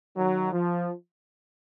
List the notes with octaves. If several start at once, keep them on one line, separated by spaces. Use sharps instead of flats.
D#3 F#3
F3